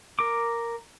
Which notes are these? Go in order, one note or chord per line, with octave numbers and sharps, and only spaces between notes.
A#4 D6